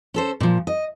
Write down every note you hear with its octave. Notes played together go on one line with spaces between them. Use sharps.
C#4 A4 C5
A#2 F3
D#5